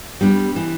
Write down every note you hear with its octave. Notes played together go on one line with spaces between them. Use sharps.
G3 B3 D4
E3